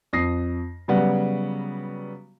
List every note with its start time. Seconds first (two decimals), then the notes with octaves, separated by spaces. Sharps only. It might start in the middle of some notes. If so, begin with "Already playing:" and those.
0.13 F2 D#6 A#6 C7
0.88 C#3 F#3 G3 B3 F#4